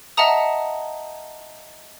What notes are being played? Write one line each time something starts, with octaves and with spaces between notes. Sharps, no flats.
D#5 E5 F#5 A5 A#5 D#6